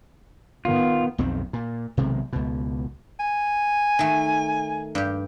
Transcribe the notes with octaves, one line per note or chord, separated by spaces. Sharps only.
D#3 B3 F4
B1 F2 D#3 C4
A#2
B1 C3 D#3 G#3
C#2 B2
G#5
D#3 A3
G2 G4